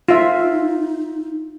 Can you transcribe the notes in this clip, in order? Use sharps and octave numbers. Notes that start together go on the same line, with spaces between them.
D#4 F4 E5